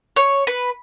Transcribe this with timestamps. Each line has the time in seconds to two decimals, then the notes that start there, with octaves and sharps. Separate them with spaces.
0.16 C#5
0.47 B4